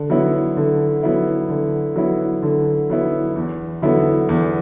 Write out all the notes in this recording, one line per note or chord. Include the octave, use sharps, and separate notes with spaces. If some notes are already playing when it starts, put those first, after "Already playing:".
Already playing: D3
F#3 B3 E4
D3
F#3 B3 E4
D3
F#3 B3 E4
D3
F#3 B3 E4
E2
D3 F#3 B3 E4
E2